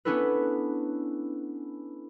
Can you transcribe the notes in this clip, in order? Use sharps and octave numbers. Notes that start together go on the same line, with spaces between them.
B3 C#4 D4 E4 A4 B4